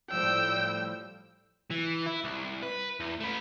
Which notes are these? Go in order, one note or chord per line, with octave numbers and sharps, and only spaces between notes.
A2 F3 G3 G5 E6
E3
E4
C2
B4
E2
A3 B4